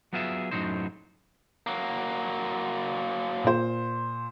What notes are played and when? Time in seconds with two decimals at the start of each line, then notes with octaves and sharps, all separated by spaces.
0.13 F#3 B3 F4 G#4 E5
0.51 F#2 A2 C3 F#3 D#4 C5
1.67 F#3 A#3
3.44 A#2 C5